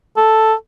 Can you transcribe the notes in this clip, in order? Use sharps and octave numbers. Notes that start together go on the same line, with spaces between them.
A4